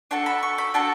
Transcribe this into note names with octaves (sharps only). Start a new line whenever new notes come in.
D4 F#4 A4 A5
B5
C#6
B5
D4 F#4 A4 A5